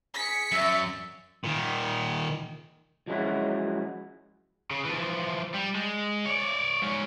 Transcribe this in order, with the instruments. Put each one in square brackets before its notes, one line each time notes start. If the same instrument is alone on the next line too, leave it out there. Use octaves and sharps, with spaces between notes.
[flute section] G#4 [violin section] B6 C#7
[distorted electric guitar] F#2 [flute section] D5 E5 E6
[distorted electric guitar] A#2 D#3
[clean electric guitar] F3 F#3 G#3 C#4 E4 F#4
[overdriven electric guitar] C#3
E3 F3
G3
G#3
C#5 D5
G#2 C#4